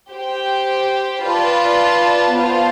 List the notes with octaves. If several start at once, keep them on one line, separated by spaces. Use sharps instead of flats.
G4 C5 G5
F4 B4 D5 A5
B3 F4 C5 F5 A5